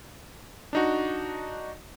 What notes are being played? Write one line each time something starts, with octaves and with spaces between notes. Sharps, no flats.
D4 D#4 F#4